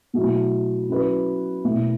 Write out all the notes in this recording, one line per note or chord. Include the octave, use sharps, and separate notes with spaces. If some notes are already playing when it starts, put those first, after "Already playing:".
B2 F#3 A3 E4
F#3 C#4 E4 B4
B2 A3 E4